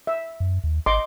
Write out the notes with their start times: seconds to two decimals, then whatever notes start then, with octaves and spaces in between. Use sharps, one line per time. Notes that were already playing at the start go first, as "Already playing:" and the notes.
0.07 E5
0.40 F#2
0.64 D#2
0.86 G#1 D#5 C6 D6